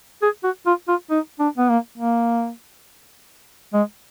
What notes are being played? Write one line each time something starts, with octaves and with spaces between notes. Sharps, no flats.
G#4
F#4
F4
F4
D#4
D4
B3
A#3
A#3
G#3